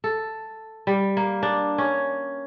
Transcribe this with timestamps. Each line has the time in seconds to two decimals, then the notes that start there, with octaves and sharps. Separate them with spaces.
0.04 A4
0.87 G3
1.17 A#3
1.43 D4
1.78 C#4